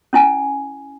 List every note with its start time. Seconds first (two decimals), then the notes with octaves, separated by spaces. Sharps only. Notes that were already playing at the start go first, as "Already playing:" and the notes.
0.13 C#4 E4 G#5